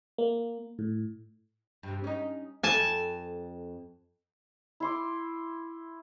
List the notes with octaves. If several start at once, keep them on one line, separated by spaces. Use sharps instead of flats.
A#3
A2
G2 C3
C#4 D#4
F2 A4 E5 G#5 A5
E4 C6 D6